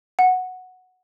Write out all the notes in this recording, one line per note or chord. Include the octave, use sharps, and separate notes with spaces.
F#5